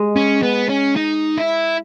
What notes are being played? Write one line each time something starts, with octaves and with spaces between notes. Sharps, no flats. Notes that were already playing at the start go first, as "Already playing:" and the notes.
Already playing: G#3
C#4
B3
C#4
D#4
E4